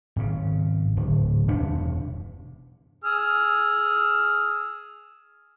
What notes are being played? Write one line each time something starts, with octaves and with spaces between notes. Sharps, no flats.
G#1 C#3
D1
E1 G2 C3 D4
G#4 E6 F6